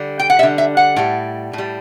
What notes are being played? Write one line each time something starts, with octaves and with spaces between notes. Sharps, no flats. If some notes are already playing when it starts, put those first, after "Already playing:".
Already playing: D3 G3
G5
F#5
D3 G3 E5
E5
F#5
A2 G3
A2 G3